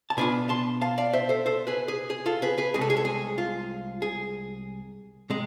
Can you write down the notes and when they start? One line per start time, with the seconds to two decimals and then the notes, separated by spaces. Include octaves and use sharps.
0.10 A5
0.17 B2 B3 D4 F4 G#5 B5
0.49 A5 C6
0.81 F5 A5
0.98 D5 F5
1.13 C5 E5
1.29 A4 C5
1.46 A4 C5
1.67 G#4 B4
1.88 G#4
2.10 G#4
2.26 F4 A4
2.42 G#4 B4
2.58 G#4 B4
2.74 C2 C3 G#3 G#4
2.81 A4
2.90 G#4
2.97 A4
3.05 G#4
3.38 F4
4.02 G#4
5.30 C3 G#3